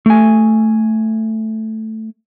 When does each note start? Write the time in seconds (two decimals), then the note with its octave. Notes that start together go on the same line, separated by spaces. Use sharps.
0.06 A3 G#5